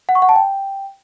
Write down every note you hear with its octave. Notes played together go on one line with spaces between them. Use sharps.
F#5
C#6
F#5
A5
G5